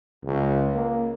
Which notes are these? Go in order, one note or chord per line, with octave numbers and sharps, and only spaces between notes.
C#2
A#3